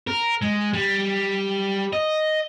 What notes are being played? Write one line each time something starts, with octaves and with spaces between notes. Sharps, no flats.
A#4
G#3
G3
D#5